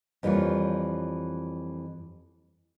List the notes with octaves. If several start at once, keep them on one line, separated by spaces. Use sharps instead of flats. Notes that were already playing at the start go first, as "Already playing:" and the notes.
F2 E3 G3 A#3 F4 C#5